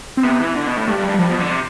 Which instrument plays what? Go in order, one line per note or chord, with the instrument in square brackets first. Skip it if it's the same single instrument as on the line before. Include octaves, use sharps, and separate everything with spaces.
[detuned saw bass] C4
[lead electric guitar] C3 [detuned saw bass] B3
[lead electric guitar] E3
D3
B2
A2
[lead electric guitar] G2 [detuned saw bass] A3
[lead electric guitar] G2
[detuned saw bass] G3
[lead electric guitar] G2
[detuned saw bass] G3
[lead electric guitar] G2 [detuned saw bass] F3
[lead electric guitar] B2
D3
C3